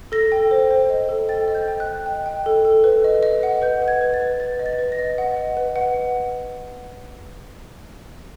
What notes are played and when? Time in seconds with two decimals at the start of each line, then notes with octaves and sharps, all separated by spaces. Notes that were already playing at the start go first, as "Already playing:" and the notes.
0.12 A4 A#6
0.32 G5
0.51 C5
0.71 C5
0.90 D#5
1.09 A4
1.29 G5 A6
1.48 D#5
1.55 G6
1.68 G5
1.80 F#6
1.87 D#5
2.06 G5
2.26 G5
2.46 A4
2.65 A4
2.84 B4
3.04 D#5
3.23 D#5
3.43 F#5
3.62 B4 G6
3.82 F#5
3.88 G#6
4.01 B4
4.14 A6
4.21 B4
4.40 B4 A6
4.59 D#5
4.66 A6
4.79 B4
4.92 A#6
4.99 D#5
5.18 F#5
5.37 D#5
5.57 B4
5.76 F#5